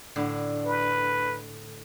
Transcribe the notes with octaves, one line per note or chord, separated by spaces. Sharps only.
A2 D3
B4